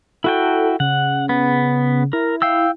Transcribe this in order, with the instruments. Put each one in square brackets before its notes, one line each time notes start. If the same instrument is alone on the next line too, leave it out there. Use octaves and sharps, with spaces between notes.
[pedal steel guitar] E4 F#4 G5 [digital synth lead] A4
[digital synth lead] C#3 [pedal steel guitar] F#5
[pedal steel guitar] B3
[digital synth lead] E4 [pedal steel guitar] A#4
[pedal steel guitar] F5 G5 E6